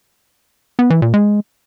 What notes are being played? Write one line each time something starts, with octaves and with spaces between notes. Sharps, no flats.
B3
E3
A#2
G#3